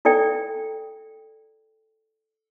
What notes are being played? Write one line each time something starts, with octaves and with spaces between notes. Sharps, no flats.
E4 A4 D5 G5